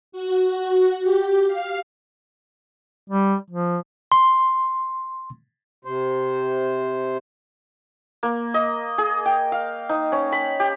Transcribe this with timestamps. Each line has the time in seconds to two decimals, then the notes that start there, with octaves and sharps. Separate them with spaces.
0.12 F#4
0.50 F#4
1.03 G4
1.47 F5
3.10 G3
3.50 F3
4.12 C6
5.85 C3 C5
8.23 A#3
8.54 D#5
8.98 G#4
9.26 G5
9.52 F5
9.89 D#4
10.12 C#4
10.32 B5
10.60 G4